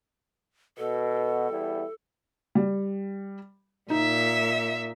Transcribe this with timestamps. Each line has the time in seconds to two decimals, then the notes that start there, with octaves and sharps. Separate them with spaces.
0.78 B2 A4
1.50 E2 G3 E4
2.55 G3
3.90 A#2 D#4 E5